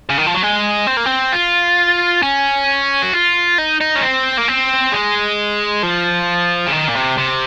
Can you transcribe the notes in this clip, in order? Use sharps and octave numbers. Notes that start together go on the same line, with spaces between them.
C#3
D#3
F3
F#3
G#3
C4
A#3
C4
F4
C#4
F#4
F4
D#4
D#4
C#4
C4
A#3
C4
G#3
F3
C#3
D#3
A#2
C3
C3